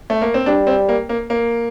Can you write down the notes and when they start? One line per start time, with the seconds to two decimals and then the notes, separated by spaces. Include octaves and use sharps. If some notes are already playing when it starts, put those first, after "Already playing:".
0.10 A3
0.22 A#3
0.34 C4
0.46 G3 D4
0.67 C4
0.89 A#3
1.09 A#3
1.30 A#3